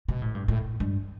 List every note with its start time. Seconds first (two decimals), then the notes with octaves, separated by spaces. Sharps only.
0.08 B2
0.22 A2
0.35 G2
0.48 A2
0.80 G2